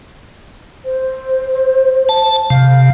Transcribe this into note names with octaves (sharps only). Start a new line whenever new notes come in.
C5
A5
C3 F5